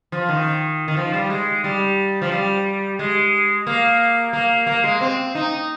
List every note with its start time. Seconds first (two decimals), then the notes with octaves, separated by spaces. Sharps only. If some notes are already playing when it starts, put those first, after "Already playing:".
0.12 F3
0.29 D#3
0.88 D#3
0.97 F3
1.14 G3
1.30 G#3
1.64 G3
2.22 F3
2.31 G3
2.99 G#3
3.67 A#3
4.33 A#3
4.67 A#3
4.84 G#3
5.01 C4
5.35 D#4